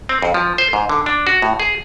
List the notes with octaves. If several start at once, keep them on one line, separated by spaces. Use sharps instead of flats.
C4
F2
F3
C5
G#2
D3
D4
F#4
A2
G#4